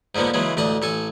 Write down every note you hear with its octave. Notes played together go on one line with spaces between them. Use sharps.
G#2 D3 F3 A#3 B3
C#3 E3 F#3 G#3
A1 D2 D5 D#5
A1 A4 G#5